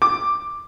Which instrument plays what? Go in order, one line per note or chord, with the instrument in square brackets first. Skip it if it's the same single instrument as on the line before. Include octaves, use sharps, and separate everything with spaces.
[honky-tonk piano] D6